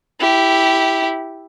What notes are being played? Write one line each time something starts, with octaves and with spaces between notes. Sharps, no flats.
E4 G4